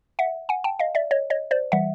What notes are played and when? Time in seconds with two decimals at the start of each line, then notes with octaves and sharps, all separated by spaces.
0.19 E5 F#5
0.49 F#5 G#5
0.64 G5 A5
0.79 D#5 F5
0.95 D5 E5
1.11 C#5 D#5
1.30 C#5 D#5
1.51 C5 D5
1.72 E3 G3 E5 F#5